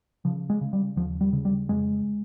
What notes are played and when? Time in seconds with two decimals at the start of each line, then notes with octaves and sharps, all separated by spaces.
0.25 C#3 F3
0.50 G#3
0.61 C#3
0.73 G3
0.96 D#2 F3
1.21 G3
1.33 C#3
1.45 G3
1.69 F2 G#3